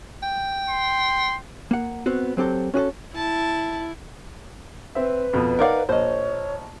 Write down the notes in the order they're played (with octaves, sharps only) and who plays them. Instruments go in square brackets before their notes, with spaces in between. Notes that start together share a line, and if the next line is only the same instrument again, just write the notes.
[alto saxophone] G5
[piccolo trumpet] C6
[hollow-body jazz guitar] A#3 F#5
B3 C4 F#4
F#3 C4 G4 A4
C#4 F#4 G#4 A4
[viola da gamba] E4 [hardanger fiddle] A5
[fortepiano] C4 E5 [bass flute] B4
[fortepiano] F2 B2
[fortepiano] D#4 D5 F#5 [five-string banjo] A#4 C#5 F5
[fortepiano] A#1 [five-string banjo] C5 D#5 [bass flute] C#5